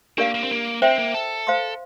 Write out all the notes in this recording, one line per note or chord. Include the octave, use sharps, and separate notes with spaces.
A#3 D4 G4 A#4 D5 F5
A#3
C4
A#3
C4 C5 E5 G5
A#3
A4
C5 F5 C6